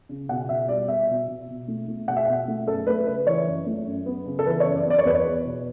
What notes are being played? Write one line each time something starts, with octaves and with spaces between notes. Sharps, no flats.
C#3
B2 F#5
B2 E5
G3 D5
B3 E5
B2
B2
B2
A3
A3
B2 F#5
E5
B2 F#5
A3
F#2 A4
A3 B4
C#3 B4
E3 C#5
F#2
A3
F#2
B3
C#3
A4
E3 B4
C#5
F#2
D5
B3
D5
C#5
E2 B4
C#5
B3
B2